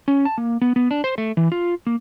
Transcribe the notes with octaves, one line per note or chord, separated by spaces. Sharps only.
C#4
A5
A#3
B3
B3
D4
C5
A3
E3
F4
A#3